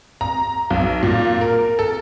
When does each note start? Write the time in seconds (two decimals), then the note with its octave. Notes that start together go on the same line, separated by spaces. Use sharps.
0.21 A#5
0.70 B1
1.03 A#2
1.41 A#4
1.79 A4